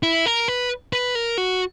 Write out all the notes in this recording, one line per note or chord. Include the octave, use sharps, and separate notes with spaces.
E4
A#4
B4
B4
A#4
F#4